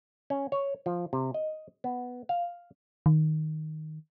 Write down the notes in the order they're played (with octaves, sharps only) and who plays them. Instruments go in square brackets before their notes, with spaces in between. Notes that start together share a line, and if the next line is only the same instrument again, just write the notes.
[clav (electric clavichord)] C#4
C#5
F3
C3
D#5
B3
F5
[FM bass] D#3